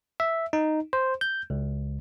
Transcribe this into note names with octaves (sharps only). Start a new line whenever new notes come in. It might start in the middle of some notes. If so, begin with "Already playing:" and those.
E5
D#4
C5
G6
C#2